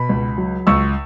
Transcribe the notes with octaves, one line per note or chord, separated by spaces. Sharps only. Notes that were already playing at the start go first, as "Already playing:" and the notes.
Already playing: B2 B5
C#2
F#3
C#2 C#6 E6